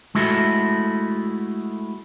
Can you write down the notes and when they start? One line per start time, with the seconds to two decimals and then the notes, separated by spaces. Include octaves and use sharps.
0.15 G#3 A3 E4 F#4 A4